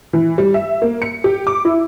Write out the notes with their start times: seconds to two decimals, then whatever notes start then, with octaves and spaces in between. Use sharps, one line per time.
0.13 E3
0.38 G3
0.54 E5
0.82 A#3
1.02 C#7
1.24 G4
1.47 D6
1.65 E4